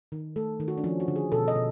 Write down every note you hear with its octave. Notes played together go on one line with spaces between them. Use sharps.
D#3
A3 A4
D#3
F#4
D4
F3 C#4
F#4
D3
G#4
B2 A4
D#5
B2